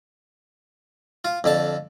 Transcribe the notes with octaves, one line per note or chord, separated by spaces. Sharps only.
F4
F2 D3 A5